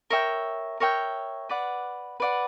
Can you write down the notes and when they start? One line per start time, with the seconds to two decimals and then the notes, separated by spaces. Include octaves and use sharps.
0.10 A#4 C#5 E5 G5
0.80 A#4 C#5 E5 G5
1.49 B4 D5 F#5
2.20 B4 D5 F#5